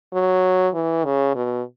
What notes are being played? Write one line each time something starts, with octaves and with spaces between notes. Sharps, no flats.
F#3
E3
C#3
B2